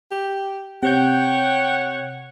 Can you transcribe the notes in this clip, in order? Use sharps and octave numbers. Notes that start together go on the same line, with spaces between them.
G4
C3 C#5 F#5 G5 G6